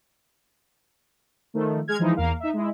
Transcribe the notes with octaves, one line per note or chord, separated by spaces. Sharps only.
D#3 F3 A3
G#3 F6 G#6
E3 F3 G#3 D#4 E4
E2 A#3 A#4 F5
D#4 E5
G#3 E4